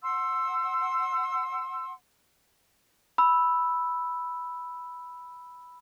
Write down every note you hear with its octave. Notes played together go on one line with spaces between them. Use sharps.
F#5 C6 E6
B5 E6